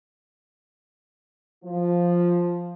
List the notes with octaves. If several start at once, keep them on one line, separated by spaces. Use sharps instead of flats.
F3